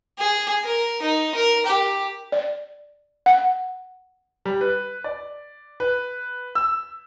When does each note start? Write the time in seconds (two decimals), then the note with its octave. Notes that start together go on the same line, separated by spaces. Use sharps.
0.19 G#4
0.64 A#4
1.02 D#4
1.35 A#4
1.66 G4
2.32 D5
3.26 F#5
4.45 G3
4.61 B4
5.04 D5
5.80 B4
6.55 E6